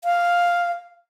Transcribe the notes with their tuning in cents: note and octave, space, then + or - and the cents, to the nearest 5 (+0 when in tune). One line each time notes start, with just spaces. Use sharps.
F5 +0